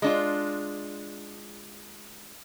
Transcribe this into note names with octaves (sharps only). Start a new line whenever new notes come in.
G#3 D4 F4